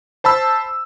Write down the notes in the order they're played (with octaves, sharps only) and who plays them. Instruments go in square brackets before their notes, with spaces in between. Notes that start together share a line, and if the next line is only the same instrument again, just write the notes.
[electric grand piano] C5 A5 B5 E6